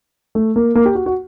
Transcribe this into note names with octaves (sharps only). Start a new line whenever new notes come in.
A3
A#3
A#3
G4
F#4
F#4